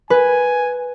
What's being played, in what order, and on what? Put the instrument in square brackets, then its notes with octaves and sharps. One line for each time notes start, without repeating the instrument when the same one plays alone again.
[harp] B4 [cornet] G#5